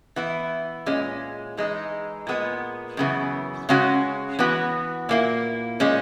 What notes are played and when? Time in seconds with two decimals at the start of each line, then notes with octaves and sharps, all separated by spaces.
0.16 E3 B3 E4
0.86 A#2 G#3 C#4
1.57 E3 G#3 D#4
2.27 A#2 G#3 B3
2.97 F#2 C#3 E3 B3
3.69 C#3 G#3 C#4 F#4
4.39 E3 B3 F#4
5.09 A#2 A#3 E4
5.80 A#2 G#3 C#4